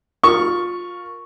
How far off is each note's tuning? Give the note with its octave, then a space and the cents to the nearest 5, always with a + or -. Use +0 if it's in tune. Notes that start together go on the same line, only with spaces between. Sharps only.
F4 +20 A#4 +0 C#6 +0